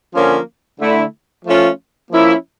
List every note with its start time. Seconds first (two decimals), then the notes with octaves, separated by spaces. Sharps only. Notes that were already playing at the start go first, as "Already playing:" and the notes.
0.15 D3 F3 A#3 C#4
0.80 D3 A3 E4
1.45 F3 A3 C#4 F4
2.11 F3 A#3 C#4 E4